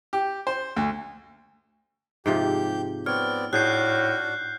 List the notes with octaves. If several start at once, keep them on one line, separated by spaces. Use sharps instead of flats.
G4
C5
D2
G#2 C3 F3 G4 G6
B3 C4 C#5 D5 F6
A2 D4 F#4 G#4 F#6 G6 C7